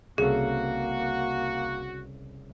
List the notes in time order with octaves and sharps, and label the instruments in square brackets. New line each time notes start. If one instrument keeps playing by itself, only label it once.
[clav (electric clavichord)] C2 C#3 A4 [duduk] A#3 [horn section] F#4 [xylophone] G#4